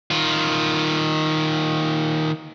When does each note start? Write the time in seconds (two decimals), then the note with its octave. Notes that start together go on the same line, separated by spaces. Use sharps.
0.11 D#3 F4